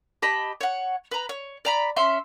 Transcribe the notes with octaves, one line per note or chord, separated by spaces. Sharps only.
G4 D#5 A5 B5
C#5 F#5
B4 A#5
C#5
D5 A#5 B5
C#4 E5 C6